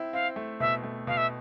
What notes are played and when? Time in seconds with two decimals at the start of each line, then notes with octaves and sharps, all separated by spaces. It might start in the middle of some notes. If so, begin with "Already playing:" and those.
Already playing: C4 E4
0.13 C4 F5
0.36 A3
0.60 B2 E5
0.84 A3
1.07 B2 F5
1.17 E5